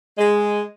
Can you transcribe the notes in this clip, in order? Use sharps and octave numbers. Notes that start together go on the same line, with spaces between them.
G#3